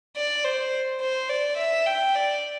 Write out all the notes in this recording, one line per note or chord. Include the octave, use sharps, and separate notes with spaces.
D5
C5
C5
D5
E5
G5
D5